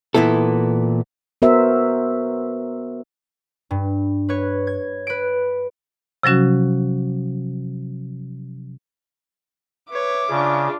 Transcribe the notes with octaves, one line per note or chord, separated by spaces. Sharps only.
A#2 E3 B3 E4 A4
B3 F#4 A#4 C5 E5
G2
B4 C#5
G#6
B4 D7
C3 F3 F#3 C#4 F#4
B4 C#5 E5 D6
C#3 D4 F4